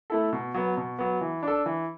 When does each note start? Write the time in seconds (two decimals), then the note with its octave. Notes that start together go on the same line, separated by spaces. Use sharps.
0.10 A3 E4 A4
0.32 B2
0.54 F#3 B3
0.77 B2
0.99 F#3 B3
1.21 E3
1.43 D4 A4
1.66 E3